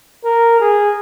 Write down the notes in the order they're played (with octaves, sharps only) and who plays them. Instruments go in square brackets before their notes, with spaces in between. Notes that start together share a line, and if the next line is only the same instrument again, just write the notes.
[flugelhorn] A#4
G#4